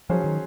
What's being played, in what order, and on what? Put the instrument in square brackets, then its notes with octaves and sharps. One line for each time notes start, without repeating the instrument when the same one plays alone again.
[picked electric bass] F3 [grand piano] F#3 C#4 G#4 C5
[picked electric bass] D#3